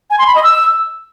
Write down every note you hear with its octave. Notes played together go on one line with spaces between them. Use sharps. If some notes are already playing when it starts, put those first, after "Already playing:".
G#5
C6
B5
D#5
E6